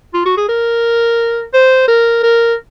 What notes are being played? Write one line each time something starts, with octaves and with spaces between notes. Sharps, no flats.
F4
F#4
G#4
A#4
C5
A#4
A#4